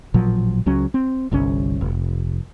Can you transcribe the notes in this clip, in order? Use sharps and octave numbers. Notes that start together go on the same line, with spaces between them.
A1 A#2 F3 F#3
C#2 F#3 C#4
C4
G1 C2 A#2 C#4
F1